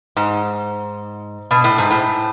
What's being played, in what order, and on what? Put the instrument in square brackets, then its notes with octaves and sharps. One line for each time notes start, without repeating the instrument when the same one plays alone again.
[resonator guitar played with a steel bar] G#2
B2
A2
G#2
A2